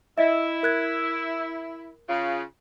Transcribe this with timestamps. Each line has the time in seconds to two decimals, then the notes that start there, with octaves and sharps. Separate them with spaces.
0.18 E4 D#5 E5
0.63 A#4 F#6 G#6
2.09 C#3 F4